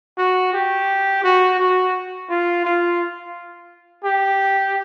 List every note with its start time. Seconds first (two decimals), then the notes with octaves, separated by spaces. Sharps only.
0.18 F#4
0.53 G4
1.24 F#4
1.59 F#4
2.30 F4
2.65 F4
4.04 G4